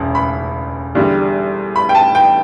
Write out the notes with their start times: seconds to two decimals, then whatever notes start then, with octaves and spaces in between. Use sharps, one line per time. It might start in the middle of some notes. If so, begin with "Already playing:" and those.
Already playing: E1 D2 C#3
0.15 B5
0.95 E2 D3 G3
1.76 B5
1.89 G5
1.95 A5
2.15 G5